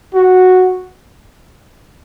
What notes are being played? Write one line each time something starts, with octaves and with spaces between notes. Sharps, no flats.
F#4